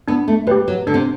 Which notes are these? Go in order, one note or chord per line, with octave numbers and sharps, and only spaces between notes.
B3 D4
A3
G3 G4 B4
F#3
D3 D4
C3